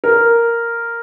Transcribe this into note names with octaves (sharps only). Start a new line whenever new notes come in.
A#4